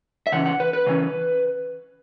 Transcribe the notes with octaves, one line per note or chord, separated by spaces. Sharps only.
E5
C#3 E3 C#4 F#5
F#5
B4
B4
C#3 E3 C#4